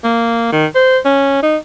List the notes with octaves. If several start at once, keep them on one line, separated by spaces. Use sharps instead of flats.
A#3
D#3
C5
C#4
D#4